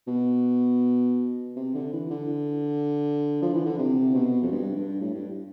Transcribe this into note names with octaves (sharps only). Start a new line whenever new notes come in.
B2
C3
D3
E3
D3
F3
E3
D3
C3
B2
F2
G2
G2
A2
G2